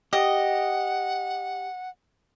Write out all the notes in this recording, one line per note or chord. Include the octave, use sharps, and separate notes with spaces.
G4 D#5 F#5